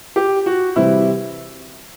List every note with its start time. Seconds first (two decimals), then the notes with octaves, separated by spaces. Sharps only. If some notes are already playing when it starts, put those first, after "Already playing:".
0.16 G4
0.46 F#4
0.76 C3 E3 G3 C4 E4